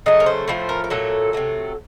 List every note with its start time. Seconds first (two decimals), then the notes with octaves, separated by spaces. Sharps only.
0.06 C#3 F#3 A3 D#5
0.20 A#4
0.26 C5
0.48 A2 F3 A3 C5
0.69 A#4
0.84 A#4
0.90 A#2 F#3 A3 A4
1.33 C3 F#3 A3